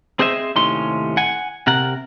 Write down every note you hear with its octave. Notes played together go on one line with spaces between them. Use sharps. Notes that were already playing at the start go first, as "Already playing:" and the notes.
C4 G#4 C5 D#5 E5
D#2 A2 C3 C#4 D#4 C6
F#5 G#5
C3 A#4 F#5